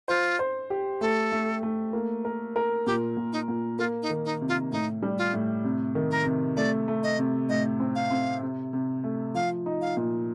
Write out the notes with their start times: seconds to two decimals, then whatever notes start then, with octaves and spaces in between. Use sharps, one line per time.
0.08 F4 C5
0.39 C5
0.70 G4
1.01 A3 A4
1.32 A3
1.63 A3
1.93 A#3
2.25 A#4
2.56 A#4
2.86 A#2 G4
3.17 A#2
3.33 D#4
3.48 A#2
3.78 A#3 F4
4.02 D#4
4.10 D#3
4.25 D#4
4.41 C3
4.49 F4
4.72 A2 D#4
5.03 G3
5.18 F4
5.33 A2
5.64 C3
5.95 D#3
6.11 A#4
6.26 C3
6.57 A3 D5
6.88 A3
7.03 D#5
7.19 C3
7.49 A2 D#5
7.80 C4
7.95 F5
8.11 C4
8.42 C3
8.73 C3
9.04 A3
9.34 F3 F5
9.66 D#4
9.81 F5
9.97 A#2